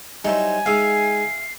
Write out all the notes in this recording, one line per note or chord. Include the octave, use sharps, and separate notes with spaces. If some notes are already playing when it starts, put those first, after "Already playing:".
F#3 G3 D#4 E4 C5 G#5
G#3 D#4 G#4 E5 F5 C7